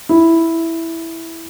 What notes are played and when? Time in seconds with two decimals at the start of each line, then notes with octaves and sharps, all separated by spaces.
0.09 E4